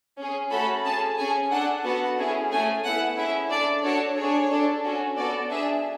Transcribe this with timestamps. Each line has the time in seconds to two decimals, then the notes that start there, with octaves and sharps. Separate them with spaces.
0.18 C#4 G#4
0.51 A3 C#4 F#4 A4 B5
0.85 C#4 G#4 A5
1.18 C#4 G#4 G#5
1.51 D4 A4 F#5
1.85 B3 F#4 A4 F#5
2.18 C#4 E4 G#4
2.51 A3 C#4 G#4 G#5
2.85 B3 E4 A4 F#5
3.18 C#4 E4 G#4 E5
3.51 D4 A4 D5
3.84 D4 F#4 A4 C#5
4.18 D4 G#4 C#5
4.51 D4 A4
4.85 C#4 F#4 A4
5.18 B3 F#4 A4 D5
5.51 D4 G#4 E5